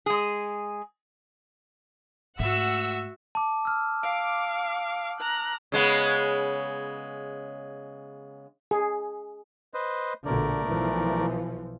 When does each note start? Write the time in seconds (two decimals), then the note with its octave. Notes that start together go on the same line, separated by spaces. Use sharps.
0.06 G#3 G#4
2.39 G#2 A3 F#4 E5 F#5 E6
3.35 A5 D6
3.65 E6 F6
4.03 F5 D6 D7
5.20 A#5 F#6
5.72 C#3 G#3 B3
8.71 G#4
9.74 B4 C5 D#5
10.26 A#1 B2 D3 A3 A#4 D5
10.68 B1 E3 F3